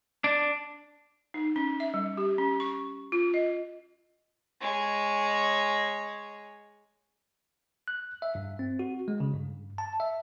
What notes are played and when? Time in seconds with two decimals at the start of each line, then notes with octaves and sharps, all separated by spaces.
0.24 D4
1.34 D#4
1.56 C#4
1.80 E5
1.94 G3
2.17 G4
2.38 C#4
2.60 C#6
3.12 F4
3.34 D#5
4.60 G#3 C#5
7.88 F#6
8.22 E5
8.35 G2
8.59 C4
8.79 F#4
9.08 G#3
9.20 C#3
9.34 G2
9.78 A5
10.00 E5